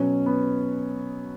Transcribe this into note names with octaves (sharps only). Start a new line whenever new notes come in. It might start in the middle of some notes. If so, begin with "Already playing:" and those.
Already playing: B2 F#3 C#4
B3